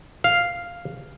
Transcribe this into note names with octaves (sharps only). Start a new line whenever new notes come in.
F5